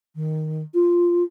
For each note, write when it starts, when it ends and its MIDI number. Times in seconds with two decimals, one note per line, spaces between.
0.15 0.63 51
0.74 1.23 65